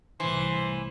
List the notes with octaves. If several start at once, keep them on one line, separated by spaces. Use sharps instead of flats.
C2 A2 E3 C5